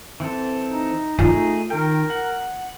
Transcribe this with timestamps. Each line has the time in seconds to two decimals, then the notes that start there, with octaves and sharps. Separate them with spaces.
0.20 E3 C4 A4
0.70 D#4
1.19 A3 D#4 F4 G#4
1.70 D#3 A#4 G5
2.10 F#5